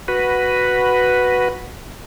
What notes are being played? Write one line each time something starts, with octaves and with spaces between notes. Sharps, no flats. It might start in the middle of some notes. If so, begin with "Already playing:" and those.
F#4 B4